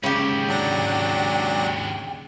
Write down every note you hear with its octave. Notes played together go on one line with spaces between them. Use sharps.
D#2 G#2 C#3 G4 G5
F#3 D4 A#6